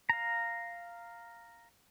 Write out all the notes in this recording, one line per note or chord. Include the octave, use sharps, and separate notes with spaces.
F5 A#5